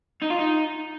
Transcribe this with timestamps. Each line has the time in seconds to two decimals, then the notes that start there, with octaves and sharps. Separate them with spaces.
0.22 D#4
0.30 F4
0.39 D#4